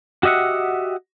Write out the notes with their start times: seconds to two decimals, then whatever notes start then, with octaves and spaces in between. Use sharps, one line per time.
0.23 F#4 G4 D#5 E5 F#5